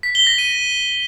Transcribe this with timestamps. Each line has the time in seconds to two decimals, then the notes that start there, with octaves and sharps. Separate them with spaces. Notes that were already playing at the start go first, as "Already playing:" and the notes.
0.03 B6
0.15 G7
0.27 A#6
0.38 D#7